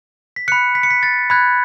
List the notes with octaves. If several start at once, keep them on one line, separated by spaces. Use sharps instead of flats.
B6
B5 F#6 C#7
B6
C#7
B6
A6
B5 F#6 G#6